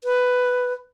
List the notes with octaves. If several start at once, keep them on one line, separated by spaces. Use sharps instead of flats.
B4